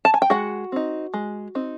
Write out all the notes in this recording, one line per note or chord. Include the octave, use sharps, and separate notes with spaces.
A5
G#5
G5
G#3 F#4 F#5
C4 D#4
G#3
C4 D#4